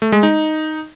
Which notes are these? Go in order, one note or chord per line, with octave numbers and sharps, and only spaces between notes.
A3
G#3
D#4